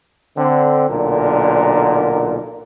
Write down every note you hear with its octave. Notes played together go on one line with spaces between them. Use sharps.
D3 C4
B1 A#2 D3 A#4